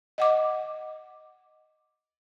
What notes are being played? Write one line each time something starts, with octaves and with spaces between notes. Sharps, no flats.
D#5 F#5 D6